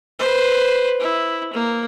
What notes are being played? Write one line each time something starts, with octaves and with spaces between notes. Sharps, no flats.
B4 C5
E4
A#3